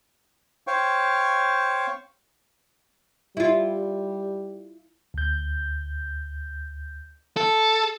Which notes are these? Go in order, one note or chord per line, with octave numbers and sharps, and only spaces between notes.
C5 C#5 F5 G5 C#6
G3 E4 F4
D2 G6
A4